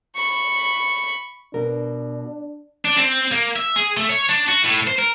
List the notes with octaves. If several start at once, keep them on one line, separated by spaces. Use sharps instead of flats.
B5 C#6
B2 D4 A#4
D4
C4
A#3
E5
G#4
A3
C#5
D4
F#4
A2
C5
A#4